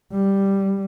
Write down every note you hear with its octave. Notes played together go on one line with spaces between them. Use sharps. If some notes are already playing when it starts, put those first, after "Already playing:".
G3